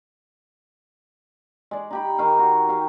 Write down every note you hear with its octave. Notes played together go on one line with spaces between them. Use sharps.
G#3 D5
D#4 G4 B5
D#3 F5
F#4
G4 F5